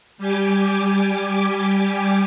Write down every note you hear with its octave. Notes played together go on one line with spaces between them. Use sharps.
G3 G4 G#5 D6